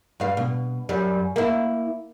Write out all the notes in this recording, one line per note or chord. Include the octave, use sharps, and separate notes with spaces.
G2 F5
B2
F#2 G3
A#3 E4